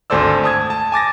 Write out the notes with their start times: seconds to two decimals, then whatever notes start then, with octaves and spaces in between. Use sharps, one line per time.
0.10 G#1 D2 A4 C5 D5 E6
0.44 A5 D#6 G#6
0.70 A5
0.92 G#5 D6 A6 A#6